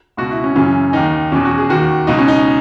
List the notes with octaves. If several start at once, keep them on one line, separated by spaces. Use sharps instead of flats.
C#2 B2 F#4
E4
C#4
F#2 C#3 E3 C#4
D#2 D#3 D#4
E2 B2 C#4
F#4
G#4
D#2 D#3 F#4
C#2 B2 D#4
C#4
D#4